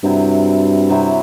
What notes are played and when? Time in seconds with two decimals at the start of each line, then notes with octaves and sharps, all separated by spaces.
0.03 G2 C3 F#3 C4 E4
0.90 C3 F#3 C4 E4